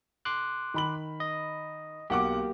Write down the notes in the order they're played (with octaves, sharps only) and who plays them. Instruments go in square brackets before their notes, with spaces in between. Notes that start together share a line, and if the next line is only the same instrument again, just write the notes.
[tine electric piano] C6 D6 F#6
[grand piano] D#3 B5 F#7
[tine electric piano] D#5
[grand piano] B1 F#5 D6 [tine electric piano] A#3 G4